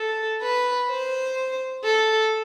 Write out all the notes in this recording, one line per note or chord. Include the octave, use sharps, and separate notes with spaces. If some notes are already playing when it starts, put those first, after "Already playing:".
Already playing: A4
B4
C5
A4